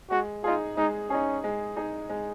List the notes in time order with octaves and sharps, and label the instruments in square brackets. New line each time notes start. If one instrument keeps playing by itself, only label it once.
[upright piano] G#3 [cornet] F#4
[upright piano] D#4 G#4 [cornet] F4
[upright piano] G#3 [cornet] D#4
[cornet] C#4 [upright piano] D#4 G#4
[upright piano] G#3
D#4 G#4
G#3